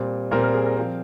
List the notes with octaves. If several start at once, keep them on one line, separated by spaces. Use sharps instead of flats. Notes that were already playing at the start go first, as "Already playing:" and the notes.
Already playing: A#2 G3 C4
A#2 G3 C4 A#4
A#4
G#4
A#4
F3 C4